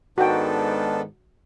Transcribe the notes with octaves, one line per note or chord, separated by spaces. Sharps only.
G#2 D#3 B3 D4 F#4 A4 G5